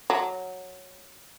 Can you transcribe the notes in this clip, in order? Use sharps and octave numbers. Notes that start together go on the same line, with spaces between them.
F#3